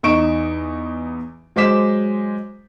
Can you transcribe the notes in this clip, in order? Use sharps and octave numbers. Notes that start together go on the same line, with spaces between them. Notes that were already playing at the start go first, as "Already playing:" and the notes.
E2 D#4 C#6 D7 E7
F#3 G#3 C5 D6 B6 E7